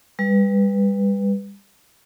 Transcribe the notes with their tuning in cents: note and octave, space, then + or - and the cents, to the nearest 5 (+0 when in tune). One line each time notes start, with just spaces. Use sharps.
G3 +30 B4 +0